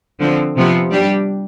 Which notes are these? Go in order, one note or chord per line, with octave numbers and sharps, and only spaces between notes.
D3 F3 C4
C3 F3 B3
G3 D4 G4